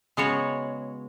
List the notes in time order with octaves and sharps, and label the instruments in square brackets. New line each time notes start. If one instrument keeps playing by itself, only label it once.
[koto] C#3 G#3 B3 F#4 C#5